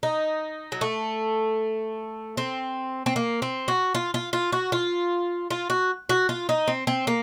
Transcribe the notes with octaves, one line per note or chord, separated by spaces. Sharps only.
D#4
F#3
A3
C4
C4
A#3
C4
F#4
F4
F4
F4
F#4
F4
F4
F#4
F#4
F4
D#4
C4
C4
A#3